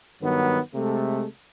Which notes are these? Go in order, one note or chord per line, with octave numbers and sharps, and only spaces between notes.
G2 D#3 F#3 B3
C3 G#3 A3